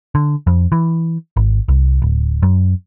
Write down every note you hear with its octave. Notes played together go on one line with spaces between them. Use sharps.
D3
F2
E3
G#1
C2
D1
F#2